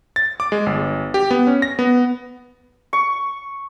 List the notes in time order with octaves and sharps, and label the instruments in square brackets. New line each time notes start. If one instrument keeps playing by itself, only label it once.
[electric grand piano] A6
D6
G#3
G1
G4
B3
C#4
A#6
B3
[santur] C#6